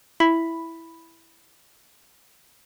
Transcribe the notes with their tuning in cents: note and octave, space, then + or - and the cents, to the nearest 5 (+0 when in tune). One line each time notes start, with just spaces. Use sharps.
E4 +0 B5 +0